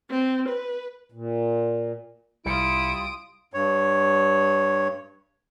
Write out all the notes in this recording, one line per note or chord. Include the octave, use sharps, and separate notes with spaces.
C4
B4
A#2
C2 G3 E4 F4 D#6 C#7 D7
G2 C#5